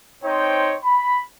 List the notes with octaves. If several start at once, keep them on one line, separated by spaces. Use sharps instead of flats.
C4 D#4 C5 C#5 G5
B5